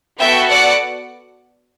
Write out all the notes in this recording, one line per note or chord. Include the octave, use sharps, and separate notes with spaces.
B3 F#4 A4 E5 G5
D5 F#5